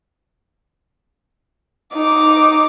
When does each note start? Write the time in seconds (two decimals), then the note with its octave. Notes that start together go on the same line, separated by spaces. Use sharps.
1.95 D#4 D6